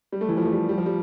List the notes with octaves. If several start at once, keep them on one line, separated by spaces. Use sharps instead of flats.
G3
A3
E3
F3
A3
G3
G3
F3
G3